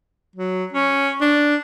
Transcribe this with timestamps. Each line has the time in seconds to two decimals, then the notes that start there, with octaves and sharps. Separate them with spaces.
0.36 F#3
0.73 C#4
1.21 D4